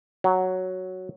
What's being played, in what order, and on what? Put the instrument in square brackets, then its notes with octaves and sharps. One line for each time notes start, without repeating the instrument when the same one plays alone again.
[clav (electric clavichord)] F#3